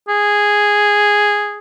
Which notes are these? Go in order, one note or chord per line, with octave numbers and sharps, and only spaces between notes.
G#4